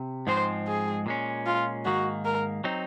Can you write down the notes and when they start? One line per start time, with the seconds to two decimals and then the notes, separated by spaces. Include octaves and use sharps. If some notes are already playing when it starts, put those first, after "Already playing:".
Already playing: C3
0.27 G#2 F3 G#3 C4 C5
0.67 G#4
1.06 A#2 G#3 C#4
1.46 F4
1.85 G#2 D#3 A#3 F#4
2.25 A#4
2.64 F#3 C4 D#4